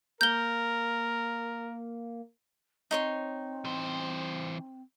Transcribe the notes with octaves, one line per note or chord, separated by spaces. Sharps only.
A#3 A#4 G6 G7
C4 D#4 C#5 C6
E3 C5